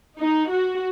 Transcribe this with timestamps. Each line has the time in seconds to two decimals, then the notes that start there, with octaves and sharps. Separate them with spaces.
0.19 D#4
0.49 F#4